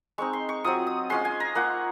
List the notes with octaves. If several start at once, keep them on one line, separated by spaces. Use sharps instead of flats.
G#3 C4 D#4 C#6
C6
C#6
F#3 C4 F4 D#6
D#6
G#3 C#4 F4 C6
G#5
A#5
A#3 F4 F#5